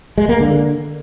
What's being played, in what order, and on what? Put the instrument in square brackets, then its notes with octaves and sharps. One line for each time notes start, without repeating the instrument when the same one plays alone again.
[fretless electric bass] G#3
A#3
D3